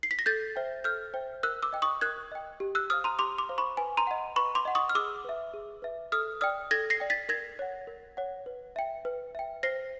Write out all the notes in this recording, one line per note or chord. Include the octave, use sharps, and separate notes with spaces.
C7
B6
A#6
A4 G6 A6
C5 E5 G5
A4 F6 G6
C5 E5 G5
A#4 E6 F#6
D6 E6
D#5 G5
C#6 D#6
A#4 F#6 G#6
D#5 G5
G4
E6 F#6
C5 F5 D#6 F6
A#5 C6
G4 C6 D6
C6 D6
C5 F5
B5 C#6
B4 G#5
A#5 C6
D#5 F#5
B4 B5 C#6
C6 D6
D#5 F#5
C#6 D#6
F6
G#4 D6 E6
B4 E5
G#4
B4 E5
A4 D#6 F6
D5 G5 D#6 F6
A4 G#6 A#6
A#6 C7
D5 G5
A6 B6
A#4 G#6 A#6
C#5 F#5
A#4
C#5 F#5
B4
E5 G5
B4
E5 G5
C5 A#6 C7